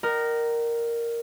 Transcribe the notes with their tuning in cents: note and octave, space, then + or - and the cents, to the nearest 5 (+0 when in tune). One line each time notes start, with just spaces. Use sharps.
A#4 +0 D#5 -40 G5 -45